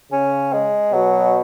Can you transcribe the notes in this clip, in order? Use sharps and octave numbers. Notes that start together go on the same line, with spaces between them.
C#3 C#4
G#3
B2 F#3